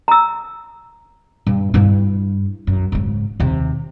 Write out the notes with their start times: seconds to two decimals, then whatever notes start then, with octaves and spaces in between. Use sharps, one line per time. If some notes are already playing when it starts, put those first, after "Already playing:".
0.08 A#5 E6
1.47 G2
1.74 G2 E4
2.67 F#2
2.92 G#2 C#3
3.40 D#2 C3